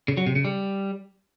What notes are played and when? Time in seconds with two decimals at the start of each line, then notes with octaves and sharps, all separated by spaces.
0.08 C#3
0.17 F#3
0.26 C3
0.36 C#3
0.45 G3